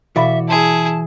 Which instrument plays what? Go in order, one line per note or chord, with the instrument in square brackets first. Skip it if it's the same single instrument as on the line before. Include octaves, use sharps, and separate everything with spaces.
[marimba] B2 F5 B5 [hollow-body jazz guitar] E3 F#4 D5 [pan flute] E5
[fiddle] E4 G#4 [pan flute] A5